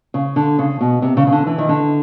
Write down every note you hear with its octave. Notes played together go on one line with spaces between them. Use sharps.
C#3
D3
C#3
B2
C3
C#3
C#3
D3
E3
D#3
D3